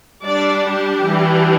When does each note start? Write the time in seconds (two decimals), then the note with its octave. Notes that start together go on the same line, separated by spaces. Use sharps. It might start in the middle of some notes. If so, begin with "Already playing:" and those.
0.22 G3 D4 D5
0.64 G4
1.04 E3 G3 D4